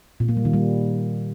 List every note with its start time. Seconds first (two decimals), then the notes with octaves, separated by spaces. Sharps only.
0.20 A#2
0.28 A#3
0.37 G3
0.45 D#3
0.53 G3